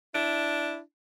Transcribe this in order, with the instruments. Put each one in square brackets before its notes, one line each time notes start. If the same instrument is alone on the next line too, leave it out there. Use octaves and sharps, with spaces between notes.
[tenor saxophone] D4 [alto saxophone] E4